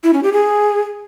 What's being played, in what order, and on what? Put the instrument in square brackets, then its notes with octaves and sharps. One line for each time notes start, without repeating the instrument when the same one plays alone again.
[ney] E4
C#4
G4
G#4